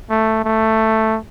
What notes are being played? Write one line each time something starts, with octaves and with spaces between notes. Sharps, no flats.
A3
A3